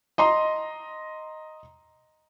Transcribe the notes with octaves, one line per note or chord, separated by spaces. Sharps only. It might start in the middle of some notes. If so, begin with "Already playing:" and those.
D#5 A#5 C6